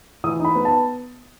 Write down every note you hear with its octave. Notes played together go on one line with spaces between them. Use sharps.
E3 D#6
D#4 B5
B3
A5